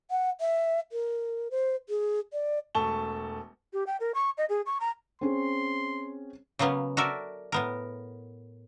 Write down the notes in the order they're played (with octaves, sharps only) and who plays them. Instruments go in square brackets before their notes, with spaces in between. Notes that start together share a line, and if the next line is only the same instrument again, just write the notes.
[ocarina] F#5
E5
A#4
C5
G#4
D5
[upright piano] E1 A3 A5 C#6 G7
[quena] G4
G5
A#4
C#6
D#5
G#4
C#6
A#5
[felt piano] C4 C#4 G#4 [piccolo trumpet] C6
[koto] C#3 F#3 A#3 B3 C#4
F#4 A4 A#4 D5 E5
A2 B3 A#4